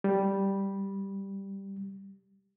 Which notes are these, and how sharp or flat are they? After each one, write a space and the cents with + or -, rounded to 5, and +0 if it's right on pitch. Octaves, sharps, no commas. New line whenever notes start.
G3 +0